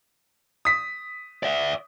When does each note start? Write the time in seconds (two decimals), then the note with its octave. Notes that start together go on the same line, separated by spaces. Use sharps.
0.65 D#6 B6
1.43 D5 E5